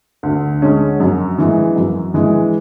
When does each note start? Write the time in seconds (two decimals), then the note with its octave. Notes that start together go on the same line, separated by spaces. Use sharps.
0.23 D2
0.62 D3 G#3 C#4
1.00 F#2
1.38 E3 G#3
1.76 F#2
2.14 E3 G#3